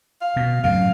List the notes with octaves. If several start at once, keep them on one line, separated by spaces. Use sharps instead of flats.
F5
B2
F#2 A2 C#3 F5